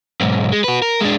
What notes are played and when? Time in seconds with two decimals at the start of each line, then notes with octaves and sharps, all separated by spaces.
0.21 B1 G#2
0.52 G#3
0.64 F#4 B4
0.82 A#4
1.01 G#3 D4